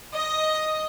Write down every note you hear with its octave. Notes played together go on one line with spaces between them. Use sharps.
D#5